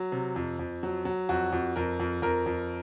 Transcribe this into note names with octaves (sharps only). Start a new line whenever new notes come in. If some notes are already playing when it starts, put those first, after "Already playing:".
Already playing: F#3
C3
F2
F2
F#3
F#3
F2 F#4
F2
F2 A#4
F2
F2 A#4
F2